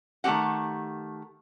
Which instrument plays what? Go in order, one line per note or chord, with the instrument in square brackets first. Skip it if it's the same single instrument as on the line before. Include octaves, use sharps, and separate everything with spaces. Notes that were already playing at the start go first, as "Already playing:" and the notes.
[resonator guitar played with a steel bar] D#3 A3 C#4 G4 F#5